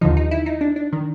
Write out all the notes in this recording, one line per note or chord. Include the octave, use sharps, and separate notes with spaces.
D#2 D3 F3 D#4
D#4
E4
D#4
D4
D4
D#3